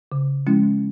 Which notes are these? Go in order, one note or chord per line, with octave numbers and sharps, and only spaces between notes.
C#3
F3 G#3 C#4 E4